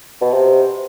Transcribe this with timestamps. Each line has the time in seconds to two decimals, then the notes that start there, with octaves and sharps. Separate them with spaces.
0.21 B2
0.33 C3